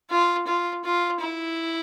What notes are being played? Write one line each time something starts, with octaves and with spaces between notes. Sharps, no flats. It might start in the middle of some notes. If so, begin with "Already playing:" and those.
F4
F4
F4
E4